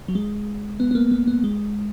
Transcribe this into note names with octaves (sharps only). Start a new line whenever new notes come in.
F#3
G#3
B3
B3
A#3
A#3
B3
G#3